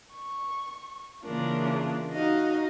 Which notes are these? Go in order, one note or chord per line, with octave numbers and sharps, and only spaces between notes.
C#6
C#3 E3 A#3 D4 F4 A#4
D#4 F#4 D#5 F5